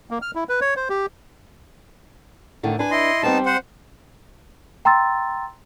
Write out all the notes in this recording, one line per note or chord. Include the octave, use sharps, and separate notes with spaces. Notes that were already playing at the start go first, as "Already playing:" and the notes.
A#3
F6
E4
B4
C#5
C5
G4
A2 D3 D#3
D4 B4 G#5
E4 D#5 C6
G3 B3 C4 D#4 A5
C5 F#5
G5 A#5 C6 E6 A6